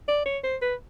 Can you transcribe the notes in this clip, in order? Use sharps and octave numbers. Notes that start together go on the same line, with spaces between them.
D5
C#5
C5
B4